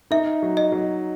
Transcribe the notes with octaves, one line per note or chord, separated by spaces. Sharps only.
D#4 E5
F#3
D#5
F#3